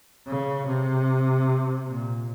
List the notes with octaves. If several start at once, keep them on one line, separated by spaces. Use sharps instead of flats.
C#3
C3
A#2